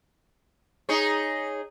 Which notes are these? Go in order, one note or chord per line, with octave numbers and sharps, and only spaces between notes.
D#4 G#4 C#5